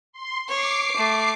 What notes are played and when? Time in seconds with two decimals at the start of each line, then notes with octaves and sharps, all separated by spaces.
0.13 C6
0.49 C#5 D6 C7
0.97 A3